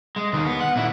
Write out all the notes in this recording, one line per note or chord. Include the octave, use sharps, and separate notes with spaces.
G#3
D#2 D#3
B3
F#5
A#2 E4